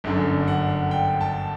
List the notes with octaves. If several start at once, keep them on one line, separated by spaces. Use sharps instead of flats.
G1 F#2 D3
F#5
G5
A5